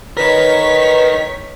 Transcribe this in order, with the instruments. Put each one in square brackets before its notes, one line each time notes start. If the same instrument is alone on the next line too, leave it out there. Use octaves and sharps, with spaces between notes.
[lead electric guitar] D#4 A#4 [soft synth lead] B4 [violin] C#5 B6